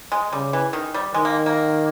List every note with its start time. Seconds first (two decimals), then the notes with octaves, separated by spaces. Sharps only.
0.12 G#3
0.32 C#3 G3
0.53 E3
0.73 D#3
0.94 G3
1.14 D#3 G#3
1.25 A#3
1.46 A#3